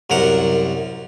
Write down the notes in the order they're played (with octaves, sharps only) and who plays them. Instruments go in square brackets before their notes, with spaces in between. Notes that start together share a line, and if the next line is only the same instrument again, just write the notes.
[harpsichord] C2 F#2 A#4 F#5